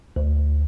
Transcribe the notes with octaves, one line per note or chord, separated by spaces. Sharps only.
D2